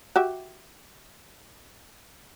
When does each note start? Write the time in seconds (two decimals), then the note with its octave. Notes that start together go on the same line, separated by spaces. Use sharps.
0.16 F#4 G4 E5